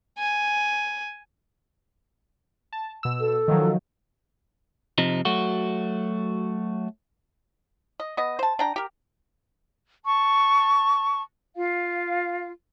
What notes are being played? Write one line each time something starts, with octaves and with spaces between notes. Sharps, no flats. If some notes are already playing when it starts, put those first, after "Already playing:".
G#5
A5
B2 E6
A4
D#3 F3 F#3
F2 C3 F3 D#4
F#3 A3 F#4
D#5
B3 D#5
C5 A5
D4 G5 A#5
G4 A#4
A5 C#6
F4 F5